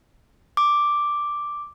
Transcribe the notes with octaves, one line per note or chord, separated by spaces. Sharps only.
D6